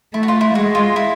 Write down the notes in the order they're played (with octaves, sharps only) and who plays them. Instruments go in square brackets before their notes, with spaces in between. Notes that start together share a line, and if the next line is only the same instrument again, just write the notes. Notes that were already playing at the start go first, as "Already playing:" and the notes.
[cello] A3 [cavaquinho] E4
[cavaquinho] F#4
F4
E4
[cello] G#3 [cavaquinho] F#4
[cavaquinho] F4
E4